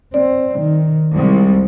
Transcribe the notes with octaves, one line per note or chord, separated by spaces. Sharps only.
C4 D5
D#3
C2 G#3